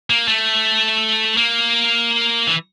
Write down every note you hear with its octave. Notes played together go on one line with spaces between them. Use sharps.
A#3
A3
A#3
E3